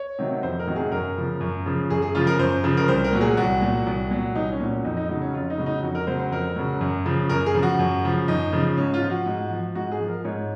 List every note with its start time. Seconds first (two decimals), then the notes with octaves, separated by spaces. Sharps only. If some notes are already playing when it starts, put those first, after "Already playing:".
Already playing: C#5
0.19 C3 D#3 F#3
0.43 F2 C5
0.59 A#4
0.67 C3 D#3 F#3
0.76 G#4
0.92 F#2 A#4
1.16 C#3 F3
1.40 F#2
1.66 C#3 F3
1.90 F#2 G#4
2.02 G#4
2.15 C#3 F3 F4
2.27 A#4
2.39 F#2 C5
2.64 C#3 F3
2.77 A#4
2.88 C2 C5
3.04 A#4
3.13 A#2 F#3
3.21 G#4
3.37 C2 F#4
3.62 A#2 F#3
3.86 C2
4.11 A#2 F#3
4.35 C2 D#4
4.52 C#4
4.60 A#2 F#3
4.84 F2 D#4
4.97 D#4
5.09 C#3 F#3 D#4
5.22 C#4
5.33 F2 F4
5.50 D#4
5.58 C#3 F#3
5.66 D#4
5.83 F2 F#4
5.95 A#4
6.07 C#3 F#3 C5
6.19 C5
6.31 F2 A#4
6.56 C#3 F#3
6.81 F#2
7.06 C#3 F3
7.30 F#2 A#4
7.46 G#4
7.54 C#3 F3
7.63 F#4
7.79 F#2
8.04 C#3 F3
8.28 F#2 D#4
8.53 C#3 F3
8.77 G#2 C#4
8.94 F4
9.02 F3
9.10 F#4
9.26 G#2
9.51 F3
9.75 G#2 F#4
9.92 G#4
10.00 F3
10.08 A#4
10.24 G#2 C#5